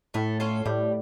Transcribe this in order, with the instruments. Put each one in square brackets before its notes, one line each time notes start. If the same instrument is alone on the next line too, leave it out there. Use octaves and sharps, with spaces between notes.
[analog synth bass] A2 [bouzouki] A3
[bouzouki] C#4 F4 A4
[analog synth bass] A2 [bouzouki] G3